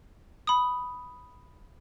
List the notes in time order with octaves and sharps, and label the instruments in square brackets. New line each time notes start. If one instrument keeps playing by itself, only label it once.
[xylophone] B5 D#6